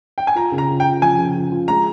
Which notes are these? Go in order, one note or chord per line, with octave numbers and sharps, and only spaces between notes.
G5
G#5
F4 A#5
C#3
A#5
F4
G5
F4
F3 G#5
C#3
F4
F4
G#3 A#5